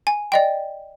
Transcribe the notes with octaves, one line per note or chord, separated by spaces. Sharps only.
G#5
D5 D#5 G5